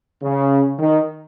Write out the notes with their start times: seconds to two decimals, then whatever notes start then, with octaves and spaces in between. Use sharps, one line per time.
0.22 C#3
0.79 D#3